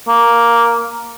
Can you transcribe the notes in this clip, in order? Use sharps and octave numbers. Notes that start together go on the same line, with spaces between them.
A#3